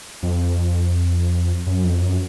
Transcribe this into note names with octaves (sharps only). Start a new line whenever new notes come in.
F2
F#2
F2
F#2